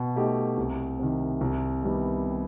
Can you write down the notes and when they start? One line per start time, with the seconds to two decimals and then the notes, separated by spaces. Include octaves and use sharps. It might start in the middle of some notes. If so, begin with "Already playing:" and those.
Already playing: B2
0.16 A3 D#4 G4
0.57 C2
0.99 C3 D#3
1.41 C2
1.82 C3 D#3 G3 B3